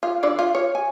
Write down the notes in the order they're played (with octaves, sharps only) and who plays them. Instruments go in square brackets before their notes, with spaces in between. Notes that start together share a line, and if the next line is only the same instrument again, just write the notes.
[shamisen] F4
D3 D4 D5
F4
C#5
G#5